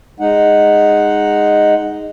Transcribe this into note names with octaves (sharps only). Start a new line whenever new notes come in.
G#3 D#4 F#5